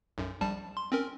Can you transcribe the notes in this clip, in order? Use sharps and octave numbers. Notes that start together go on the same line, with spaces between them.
B1 F#2
A#1 G3 A5
C6
C4 C#4 A#4